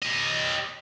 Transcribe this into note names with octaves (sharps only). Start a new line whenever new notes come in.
G4 D#5